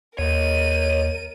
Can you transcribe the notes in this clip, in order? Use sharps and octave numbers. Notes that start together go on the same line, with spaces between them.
D#2 A#4 C#5 D#5 D#7